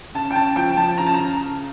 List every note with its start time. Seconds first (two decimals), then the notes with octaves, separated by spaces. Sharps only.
0.14 C#3 A5
0.31 G5
0.35 C#3 A5
0.56 F3 G5
0.77 F3 A5
0.98 C#3 A#5
1.06 A5
1.14 C#3 A#5